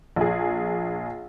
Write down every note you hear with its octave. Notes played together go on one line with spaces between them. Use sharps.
A#1 G#4